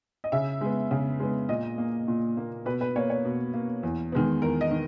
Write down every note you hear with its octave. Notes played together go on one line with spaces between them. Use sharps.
D#5
C#3 E5
G#3 B3
C#3
G#3 B3
A#2 D#5
A#3
A#2
A#3
B2 B4
B4
A#3 C#5
C#5
B2
A#3
E2
D#3 G#3 B3
E2 A#4
D#5
D#3